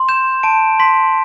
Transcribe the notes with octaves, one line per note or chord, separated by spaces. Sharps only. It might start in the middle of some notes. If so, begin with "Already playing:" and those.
Already playing: C6
G6 E7
A5 D7
C6 B6